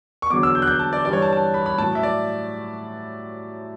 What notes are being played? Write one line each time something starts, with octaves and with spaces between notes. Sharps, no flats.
C#6
E2 D3 F#3 D6
E6
G6
F#6
G6
A5
D5
G2 E3 G3 D5
C#5
A5
A5
B5
B5
A2 F#3 A5
E5
D5